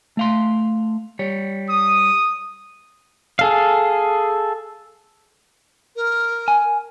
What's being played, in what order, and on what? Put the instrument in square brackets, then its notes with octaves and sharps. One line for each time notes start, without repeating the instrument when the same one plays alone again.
[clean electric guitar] A3 F5 C6
G3 C#5
[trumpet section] D#6
[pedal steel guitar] G#4 A4 F5
[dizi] A#4
[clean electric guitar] G#5